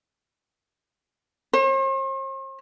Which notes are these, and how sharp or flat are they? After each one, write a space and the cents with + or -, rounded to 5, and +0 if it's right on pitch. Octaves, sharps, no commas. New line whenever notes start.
C5 +45